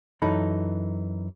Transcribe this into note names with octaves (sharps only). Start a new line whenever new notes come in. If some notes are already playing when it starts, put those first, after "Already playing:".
F#2 E3 D#4 A4 B5